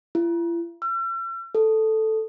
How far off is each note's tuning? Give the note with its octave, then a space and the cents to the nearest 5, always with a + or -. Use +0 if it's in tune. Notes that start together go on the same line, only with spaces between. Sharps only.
E4 +45
E6 +45
A4 +0